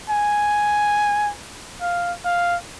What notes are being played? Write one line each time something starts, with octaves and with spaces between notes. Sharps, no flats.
G#5
F5
F5